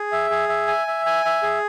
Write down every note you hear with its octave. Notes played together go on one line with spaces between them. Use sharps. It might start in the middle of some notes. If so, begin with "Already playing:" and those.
Already playing: G#4
E5
G#4
E5
G#5
E5
G#5
E5
G#4